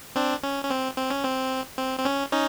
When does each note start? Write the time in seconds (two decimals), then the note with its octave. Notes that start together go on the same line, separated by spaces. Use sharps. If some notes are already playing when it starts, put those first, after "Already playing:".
0.16 C4 D4
0.43 C#4
0.64 C#4
0.70 C4
0.97 C4
1.10 C#4
1.23 C4
1.78 C4
1.99 C4
2.05 C#4
2.32 C#4 D#4